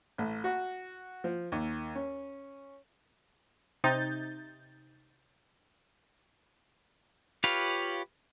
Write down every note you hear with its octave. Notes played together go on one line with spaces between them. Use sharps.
A1
F#4
F3
D#2
C#4
C3 D#4 G6 A6
F4 G4 B4 C#5 F5